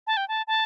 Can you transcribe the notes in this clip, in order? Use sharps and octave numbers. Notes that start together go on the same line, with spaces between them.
A5
G5
A5
A5